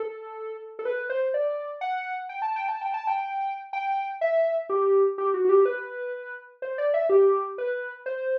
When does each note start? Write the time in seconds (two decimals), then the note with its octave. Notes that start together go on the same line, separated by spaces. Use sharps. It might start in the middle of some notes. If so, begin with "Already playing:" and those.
Already playing: A4
0.79 A4
0.85 B4
1.10 C5
1.34 D5
1.81 F#5
2.29 G5
2.42 A5
2.56 G5
2.69 A5
2.81 G5
2.94 A5
3.07 G5
3.73 G5
4.21 E5
4.70 G4
5.18 G4
5.34 F#4
5.45 F#4
5.49 G4
5.65 B4
6.62 C5
6.78 D5
6.94 E5
7.10 G4
7.58 B4
8.06 C5